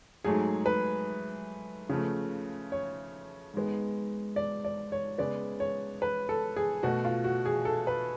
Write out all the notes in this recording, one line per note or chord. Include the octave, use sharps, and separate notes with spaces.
G#2 F#3 A3 G#4
B4
C#3 F3 A3
C#5
G#2 G#3 B3
D5
D5
C#5
C#3 G#3 B3 D5
C#5
B4
A4
G#4
B2 A3 F#4
F4
F#4
G#4
A4
B4